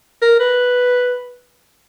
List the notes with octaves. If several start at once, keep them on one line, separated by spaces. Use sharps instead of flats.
A#4
B4